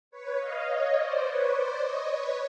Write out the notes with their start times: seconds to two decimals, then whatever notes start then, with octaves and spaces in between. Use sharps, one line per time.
0.11 B4 C#5
0.38 D#5 F5
0.67 C#5 D#5
0.96 C5 D5
1.24 B4 C#5
1.53 C5 D5
1.81 C#5 D#5
2.09 B4 C#5